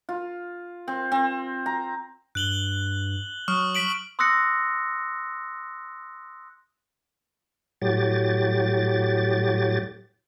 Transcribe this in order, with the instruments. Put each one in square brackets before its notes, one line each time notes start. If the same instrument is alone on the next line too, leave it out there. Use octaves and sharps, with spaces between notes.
[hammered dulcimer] F4
C4
C4
A#5
[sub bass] G2 [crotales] F#6 F#7 G7
[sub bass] F#3 [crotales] C#6 D#6 F6
[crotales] B6 D7 F#7
[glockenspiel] C6 D#6 E6 F#6 A#6 C#7
[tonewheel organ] A2 F#3 G4 A6